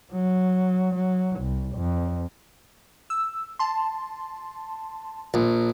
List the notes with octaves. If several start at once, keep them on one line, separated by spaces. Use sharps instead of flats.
F#3
F#3
C2
F2
E6
A5 C6
A#1